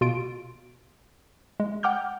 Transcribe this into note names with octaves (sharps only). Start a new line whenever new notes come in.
B2 F4 D7
G#3
F#5 G5 D6 F6 G6